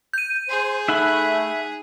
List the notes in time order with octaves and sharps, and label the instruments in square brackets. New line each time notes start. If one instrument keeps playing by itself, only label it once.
[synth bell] G6 D#7
[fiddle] G#4 [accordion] C5
[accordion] A3 [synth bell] D#4 [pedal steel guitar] E5 F#5 B5